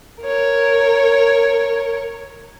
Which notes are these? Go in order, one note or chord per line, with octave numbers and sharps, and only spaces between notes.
A#4 C#5